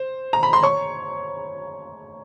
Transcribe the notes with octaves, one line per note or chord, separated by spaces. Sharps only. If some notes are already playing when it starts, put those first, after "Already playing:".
Already playing: C5
A#5
B5
C6
C#5 C#6